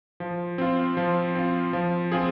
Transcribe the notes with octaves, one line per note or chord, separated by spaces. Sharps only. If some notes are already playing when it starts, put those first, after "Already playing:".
F3
C4 F4
F3
C4 F4
F3
C4 F4 G#4